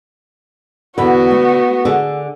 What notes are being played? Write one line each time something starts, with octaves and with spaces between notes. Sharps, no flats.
E2 D3 B3 F#4 B4
A3
D3 G#4 A4